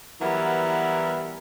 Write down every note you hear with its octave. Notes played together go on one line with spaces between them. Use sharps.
E3 F#3 G3 B3 A#4 E5